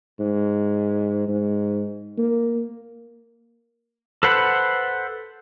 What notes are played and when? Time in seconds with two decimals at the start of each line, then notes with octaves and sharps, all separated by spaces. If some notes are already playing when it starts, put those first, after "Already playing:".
0.20 G#2
1.28 G#2
2.18 A#3
4.23 A4 B4 C5 F#5 B5